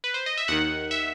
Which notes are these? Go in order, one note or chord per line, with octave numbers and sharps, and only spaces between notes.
B4
C5
D#5
E5
D#2 D#3 F#5
E5